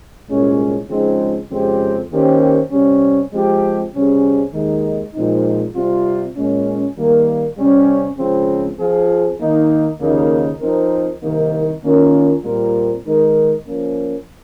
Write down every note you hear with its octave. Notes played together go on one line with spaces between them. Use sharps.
C2 A#2 G#3 C#4
C#3 F3 G#3 C4 D#4
F2 C#3 G#3 C4 G4
D#3 A#3 C#4 G4 C5
C3 G3 C#4
F3 G#3 C4 G4
C3 G3 C#4 G#4
D#2 D#3 G#3 D#4
A#2 F3 G#3 C4 D#4
C3 G3 C4 F4
A#2 G#3 C#4
D#3 G3 A#3
C3 G3 C#4
C#2 C#3 F3 C4
F3 C4 F4 G#4
D#3 A#3 D#4
D#2 C#3 F3 A#3 D#4
F3 C4 D#4 A#4
C2 C3 D#3 A#3 D#4
D#3 A#3 C#4 F4 A#4
A#2 G3 C4 F4 A#4
D#3 G#3 D#4 A#4
F3 A#3 C#4